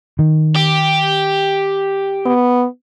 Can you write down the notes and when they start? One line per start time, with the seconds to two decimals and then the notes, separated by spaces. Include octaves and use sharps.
0.19 D#3
0.56 G4
2.25 B3